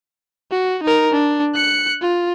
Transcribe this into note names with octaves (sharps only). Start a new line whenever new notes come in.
F#4
D#4 A#4
D4
F#6 C#7
F4